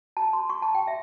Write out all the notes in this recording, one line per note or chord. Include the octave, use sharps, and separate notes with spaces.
A5
C6
C#6
A5
G5
E5